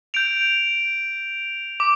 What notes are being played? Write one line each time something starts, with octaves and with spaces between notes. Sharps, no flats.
G6 D7 F7
D6